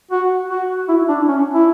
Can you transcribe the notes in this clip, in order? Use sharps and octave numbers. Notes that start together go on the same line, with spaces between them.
F#4
F#4
E4
D4
C#4
E4